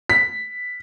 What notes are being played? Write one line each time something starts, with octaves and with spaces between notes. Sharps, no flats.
B6